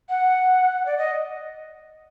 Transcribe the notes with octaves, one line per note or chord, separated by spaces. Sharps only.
F#5
D5
D#5